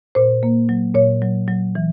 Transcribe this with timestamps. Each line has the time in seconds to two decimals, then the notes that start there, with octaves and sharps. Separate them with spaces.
0.15 A#2 C5
0.43 A#3
0.69 F#3
0.95 A#2 C#5
1.22 F#3
1.48 F#3
1.75 E3